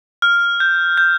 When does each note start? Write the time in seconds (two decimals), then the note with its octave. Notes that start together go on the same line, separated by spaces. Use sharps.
0.22 F6
0.60 G6
0.97 G6